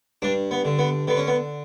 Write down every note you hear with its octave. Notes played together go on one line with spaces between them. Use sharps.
G2 D4
B3
D3
B3
D3 B3
C#4
B3